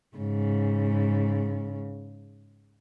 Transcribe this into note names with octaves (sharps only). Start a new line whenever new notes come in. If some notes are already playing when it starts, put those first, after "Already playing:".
G#2 C#3